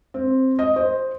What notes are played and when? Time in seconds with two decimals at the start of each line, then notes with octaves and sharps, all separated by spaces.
0.14 C4
0.59 D#5
0.76 C5